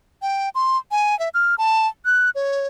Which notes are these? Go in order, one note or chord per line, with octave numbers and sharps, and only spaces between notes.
G5
C6
G#5
E5
F6
A5
F#6
C#5